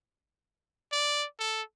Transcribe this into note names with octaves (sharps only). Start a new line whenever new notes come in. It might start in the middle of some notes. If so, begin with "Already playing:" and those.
D5
A4